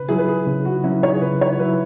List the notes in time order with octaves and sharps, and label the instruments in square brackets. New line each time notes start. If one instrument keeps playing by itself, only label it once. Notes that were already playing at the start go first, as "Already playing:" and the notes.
Already playing: [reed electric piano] C#3 [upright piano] B4
[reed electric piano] F#3 E4 [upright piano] G#4
[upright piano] B4
G#4
[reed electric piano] C#3 [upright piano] G#4
[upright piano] F#4
[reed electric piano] F#3 E4 [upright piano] C#4
[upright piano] C#5
G#4
[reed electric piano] C#3 [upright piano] B4
[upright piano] C#5
[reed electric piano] F#3 E4 [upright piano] B4